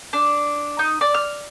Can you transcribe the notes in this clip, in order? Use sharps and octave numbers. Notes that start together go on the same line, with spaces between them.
D4
D#4
D5
F6